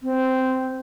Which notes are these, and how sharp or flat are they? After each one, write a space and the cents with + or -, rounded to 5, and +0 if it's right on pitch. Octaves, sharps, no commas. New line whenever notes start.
C4 -10